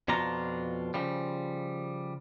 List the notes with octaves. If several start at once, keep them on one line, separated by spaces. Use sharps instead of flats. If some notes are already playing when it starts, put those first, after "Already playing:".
F2 B2 D4 F4 A#5
C#3 F3 G3